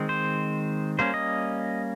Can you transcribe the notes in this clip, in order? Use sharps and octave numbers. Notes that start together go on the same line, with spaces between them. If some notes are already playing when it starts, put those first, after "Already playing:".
Already playing: D#3 G#3 C4
C5
G3 A#3 C#4 C5
D#5